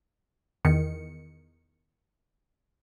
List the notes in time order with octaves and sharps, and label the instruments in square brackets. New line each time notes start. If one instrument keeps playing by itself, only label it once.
[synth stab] E2 D#3 C#7